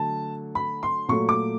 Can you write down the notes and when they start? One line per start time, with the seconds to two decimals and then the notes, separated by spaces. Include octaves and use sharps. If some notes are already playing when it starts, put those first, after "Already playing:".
Already playing: D3 F#3 A3 A5
0.55 B5
0.83 C6
1.08 A#2 F#3 A3 C#6
1.29 D6